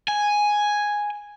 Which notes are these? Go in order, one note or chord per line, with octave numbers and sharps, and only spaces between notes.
G#5